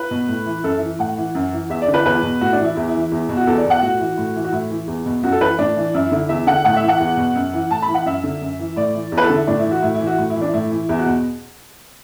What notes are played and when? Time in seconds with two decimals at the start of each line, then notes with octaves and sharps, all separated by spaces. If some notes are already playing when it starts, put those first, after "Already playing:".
Already playing: B4
0.11 B2
0.28 A2
0.46 E3
0.64 F#2 A4
0.76 E4
0.82 E3
0.99 A2 F#5
1.17 E3
1.35 F#2
1.53 E3
1.70 E2 E5
1.82 D5
1.88 D3
1.94 B4
2.05 E2 B4
2.23 B2
2.41 A2 F#4
2.53 D4
2.58 E3
2.64 E4
2.76 E2 E4
2.88 E4
2.94 E3
3.00 E4
3.12 E2
3.29 B2
3.37 F#4
3.47 E2 A4
3.58 D5
3.65 B2
3.70 F#5
3.82 A2 F#4
4.00 E3
4.18 A2
4.36 E3
4.44 F#4
4.53 A2 E4
4.70 E3
4.88 E2
5.06 B2
5.23 F#2 F#4
5.32 A4
5.41 E3 B4
5.59 A2 D4
5.77 E3
5.94 F#2 E4
6.12 D3 E4
6.29 E2 E5
6.47 D3 F#5
6.64 A2 F#5
6.76 E5
6.83 E3
6.88 F#5
7.00 E2
7.17 B2
7.35 F#2
7.53 E3
7.70 A2 A5
7.82 B5
7.88 E3
7.94 F#5
8.06 F#2 E5
8.24 D3
8.42 F#2
8.59 E3
8.76 A2 D5
8.94 E3
9.12 E2
9.18 B4
9.24 A4
9.30 D3
9.36 E4
9.47 A2 D4
9.59 E4
9.65 E3
9.71 F#4
9.82 A2 E4
9.94 E4
10.00 E3
10.07 F#4
10.18 A2
10.30 E4
10.36 E3
10.41 D4
10.54 A2 E4
10.71 E3
10.89 E2 E4
10.98 F#4
11.06 B2